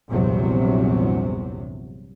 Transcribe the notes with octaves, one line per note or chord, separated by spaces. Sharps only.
A#1 E2 G2 C3 F#3